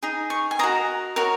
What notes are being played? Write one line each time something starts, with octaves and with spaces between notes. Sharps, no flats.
D#4 G#4
C#6
G#5
F#4 A#4 D#5 A#5
F#4 A#4 C#5